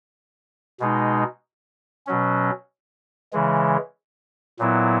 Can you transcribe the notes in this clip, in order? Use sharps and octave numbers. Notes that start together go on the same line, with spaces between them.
B2 G#3 D#4
B2 F#3 C#4
C#3 E3 G#3
A#2 F#3 B3 E4